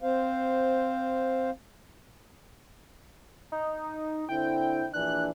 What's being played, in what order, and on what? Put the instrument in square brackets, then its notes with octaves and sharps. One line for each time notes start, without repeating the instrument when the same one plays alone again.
[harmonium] C4 C5 F5
[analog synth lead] D#4
[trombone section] D3 C4 E4 [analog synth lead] G5
[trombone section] A#1 E3 D4 [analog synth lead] F#6